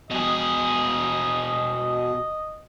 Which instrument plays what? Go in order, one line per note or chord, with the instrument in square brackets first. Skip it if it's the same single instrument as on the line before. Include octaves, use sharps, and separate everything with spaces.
[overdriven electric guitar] B2 G#4 [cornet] D#5